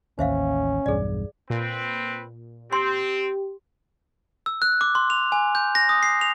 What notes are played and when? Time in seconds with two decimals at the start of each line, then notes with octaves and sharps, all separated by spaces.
0.19 A1 D#2 C#4 C5 E5 F5
0.86 B1 E2 G2 G#4 D5
1.50 A#2 C4 B4
2.73 C4 G4 C6
4.46 E6
4.62 F#6
4.81 D6
4.95 C6
5.10 F7
5.32 G#5
5.55 G6
5.75 A#6
5.89 D#6
6.03 C7
6.21 F7